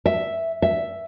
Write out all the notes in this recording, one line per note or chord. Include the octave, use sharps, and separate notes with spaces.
E5
E5